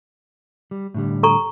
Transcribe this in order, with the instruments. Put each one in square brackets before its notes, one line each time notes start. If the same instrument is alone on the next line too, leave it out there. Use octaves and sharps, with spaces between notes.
[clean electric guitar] G3
A2 D3 G3
[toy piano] A4 A#5 C#6